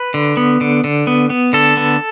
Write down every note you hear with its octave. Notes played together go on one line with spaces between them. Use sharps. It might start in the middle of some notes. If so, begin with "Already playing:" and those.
Already playing: B4
D3
B3
D3
D3
B3
B3
D3 A4
B3